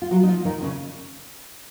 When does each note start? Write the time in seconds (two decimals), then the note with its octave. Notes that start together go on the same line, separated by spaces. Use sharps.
0.02 F4
0.11 F#3 F#4
0.23 D#4
0.28 F3 F4
0.45 D#3 D#4
0.62 C#3 C#4